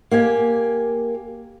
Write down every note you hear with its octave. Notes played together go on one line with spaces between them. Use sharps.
A#3 G4 G#5